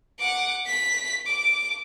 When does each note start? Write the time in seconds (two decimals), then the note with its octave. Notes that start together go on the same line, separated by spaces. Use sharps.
0.20 F#5 D6
0.66 B6
1.27 D6